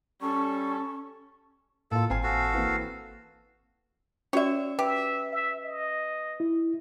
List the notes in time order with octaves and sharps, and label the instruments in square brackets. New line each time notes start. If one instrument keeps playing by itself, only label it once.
[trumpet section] G3 A4 [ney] C#4 [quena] C#6
[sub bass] A2 [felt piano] A#3 F4 [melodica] A4
[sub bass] G#1 [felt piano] C4 G#5 [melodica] F5
[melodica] F#4 A4 F5
[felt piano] E3 A#3 C4
[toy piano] C#4 F#4 D5 [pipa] C#5 E5
[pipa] G4 [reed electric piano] B4 [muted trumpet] E5
[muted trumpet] E5
D#5
[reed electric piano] E4